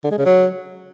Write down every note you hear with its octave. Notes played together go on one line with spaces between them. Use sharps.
D3
G#3
C#3
F#3